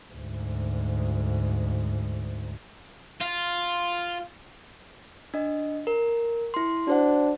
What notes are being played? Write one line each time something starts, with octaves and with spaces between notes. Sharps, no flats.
D2 G#2
F4
D4 D#5
A#4
E4 C6
D4 F#4 C5 F#5